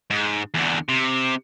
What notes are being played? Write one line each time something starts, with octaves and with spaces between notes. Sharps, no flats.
G#2
E2 D3
C3